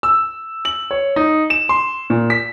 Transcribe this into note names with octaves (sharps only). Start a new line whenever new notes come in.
E6
F#7
C#5
D#4
E7
C6
A#2
B6